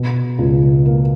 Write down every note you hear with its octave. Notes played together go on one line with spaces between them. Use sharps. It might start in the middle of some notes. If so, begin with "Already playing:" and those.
Already playing: B2
C#2
A#3